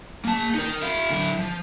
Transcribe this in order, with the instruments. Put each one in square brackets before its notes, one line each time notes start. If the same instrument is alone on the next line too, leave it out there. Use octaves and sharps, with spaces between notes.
[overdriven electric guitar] A#3 A5
D#4 A#4
E4 F5
D3 E4
F3